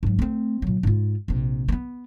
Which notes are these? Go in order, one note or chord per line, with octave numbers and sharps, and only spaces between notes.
G#2 F#3
A3 C4
A#2 F#3
G#2 F4
A#1 C3
A#3 B3